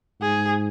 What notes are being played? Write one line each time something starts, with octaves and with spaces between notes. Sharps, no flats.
G#2 G#4